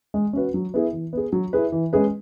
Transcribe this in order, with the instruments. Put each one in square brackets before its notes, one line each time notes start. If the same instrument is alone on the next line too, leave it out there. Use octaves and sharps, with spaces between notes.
[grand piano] G#3
C#4 F#4 B4
F#3
B3 E4 G#4
E3
B3 G#4
F#3
E4 G#4 B4
E3
G#3 C#4 G#4 B4